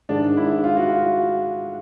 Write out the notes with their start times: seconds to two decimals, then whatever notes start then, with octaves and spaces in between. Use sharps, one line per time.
0.09 G#2 D#3 G#3 D4
0.37 E4
0.64 F4
0.77 F#4
0.90 F4